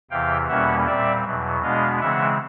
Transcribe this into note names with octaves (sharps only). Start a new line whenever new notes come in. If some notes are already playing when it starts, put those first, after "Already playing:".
E2 C3 E3 F5 G5
E2 B2 G3 A#3 C#4 E5 F#5
A#2 G3 C4 D5 E5
E2 B2 F#3
B2 G#3 B3 D4 D#5 F5
C#3 E3 G#3 C4 E5 F#5